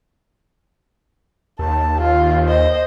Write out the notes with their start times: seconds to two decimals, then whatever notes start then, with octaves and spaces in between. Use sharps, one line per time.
1.59 D#2 A5
2.00 F4
2.45 C5 D#5